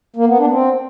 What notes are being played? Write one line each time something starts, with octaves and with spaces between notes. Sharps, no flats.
A#3
B3
D4
C4